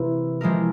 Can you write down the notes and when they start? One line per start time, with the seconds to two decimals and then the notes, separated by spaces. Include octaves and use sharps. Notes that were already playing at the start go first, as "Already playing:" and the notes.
Already playing: C3 E3 A#3 E4
0.41 C3 F3 G#3 E4 A#4